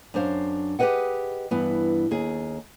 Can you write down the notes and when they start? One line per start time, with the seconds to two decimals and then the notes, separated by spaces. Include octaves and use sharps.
0.14 F#2 D4 C5 F5
0.79 G4 G#4 A#4 B4 D#5 F#5
1.51 G2 E3 B3
2.11 D#2 G#4